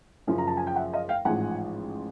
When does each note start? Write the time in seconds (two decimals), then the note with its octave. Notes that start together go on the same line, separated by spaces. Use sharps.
0.27 F#2 C#3 F3
0.38 A#5
0.47 A5
0.57 G#5
0.67 G5
0.76 E5 F#5
0.93 D#5 F5
1.09 F5 G5
1.25 A1 G#2 F3 G#3 F#5 G#5